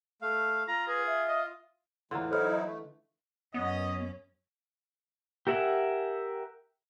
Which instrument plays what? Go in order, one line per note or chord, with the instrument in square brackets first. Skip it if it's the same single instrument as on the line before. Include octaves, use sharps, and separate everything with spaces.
[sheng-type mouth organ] A3 F5
[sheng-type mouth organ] F4 [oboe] A#5
[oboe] G#4 [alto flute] B4
[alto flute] E5
[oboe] D#5
[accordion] E2 A2 [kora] D3 E3 F4 [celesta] A#5 C6
[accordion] F#3 D#4 E4 [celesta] A4 C5 F6
[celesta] D#5 E5
[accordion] A3
[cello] F#2 C#4 [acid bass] B3 [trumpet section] D#5
[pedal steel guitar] G4 A#4 E5 F#5 G#5